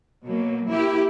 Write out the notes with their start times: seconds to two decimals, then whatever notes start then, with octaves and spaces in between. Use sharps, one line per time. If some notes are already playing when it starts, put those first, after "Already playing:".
0.24 B2 F#3 A#3
0.67 A#3 E4 G4